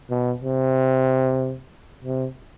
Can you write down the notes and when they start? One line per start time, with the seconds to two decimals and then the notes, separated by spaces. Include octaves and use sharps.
0.10 B2
0.41 C3
2.04 C3